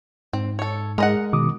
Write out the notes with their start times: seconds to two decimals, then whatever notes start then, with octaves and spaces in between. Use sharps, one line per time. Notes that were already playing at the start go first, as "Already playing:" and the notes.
0.33 G#2 C4
0.59 A4 C#5
0.98 G#3 A#4 D#5 F#5
1.33 B2 D#3 D6 D#6